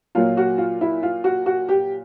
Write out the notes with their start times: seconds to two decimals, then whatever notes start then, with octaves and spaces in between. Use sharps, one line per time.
0.15 A#2 F#3 A#3 F4
0.37 F#4
0.58 F4
0.81 E4
1.03 F4
1.24 F#4
1.46 F#4
1.69 G4